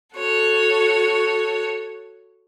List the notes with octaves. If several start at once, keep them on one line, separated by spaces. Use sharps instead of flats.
F#4 A4 C#5